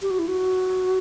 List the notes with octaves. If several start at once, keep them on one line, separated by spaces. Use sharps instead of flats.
G4
F#4
E4
F#4